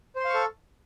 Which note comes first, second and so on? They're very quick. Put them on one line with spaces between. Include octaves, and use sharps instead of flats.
C5 C6 F5 C#6 A4